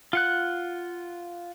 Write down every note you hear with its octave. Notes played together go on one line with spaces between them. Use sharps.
F4 F#5 F#6